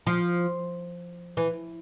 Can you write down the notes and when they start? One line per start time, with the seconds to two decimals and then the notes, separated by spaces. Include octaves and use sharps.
0.07 F3
1.37 E3